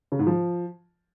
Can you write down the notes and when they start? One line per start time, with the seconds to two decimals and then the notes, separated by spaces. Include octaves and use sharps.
0.12 C#3
0.19 G#2
0.27 F3